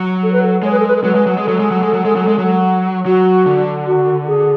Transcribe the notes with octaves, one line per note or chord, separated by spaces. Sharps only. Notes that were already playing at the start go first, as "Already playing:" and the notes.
Already playing: F#3
A4
B4
A4
G#3 C#5
B4
A4
B4
A4
F#3 B4
G#3
F#3
G#3
F#3 A4
G#3
F#3
G#3
F#3
G#3
F#3
G#3
F#3
F#3 F#4
D3
F#4
G#4